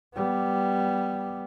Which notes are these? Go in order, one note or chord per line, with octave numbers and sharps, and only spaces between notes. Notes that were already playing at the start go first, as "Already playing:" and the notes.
G3 B3